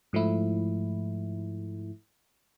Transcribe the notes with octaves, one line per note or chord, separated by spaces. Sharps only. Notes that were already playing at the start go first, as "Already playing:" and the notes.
G#2 F3 A3 E4